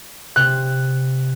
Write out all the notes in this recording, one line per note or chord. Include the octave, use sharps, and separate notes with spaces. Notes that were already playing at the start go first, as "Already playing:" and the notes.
C3 F#6